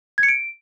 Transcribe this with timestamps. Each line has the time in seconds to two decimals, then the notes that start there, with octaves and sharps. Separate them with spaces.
0.18 G#6
0.23 C#7
0.28 D7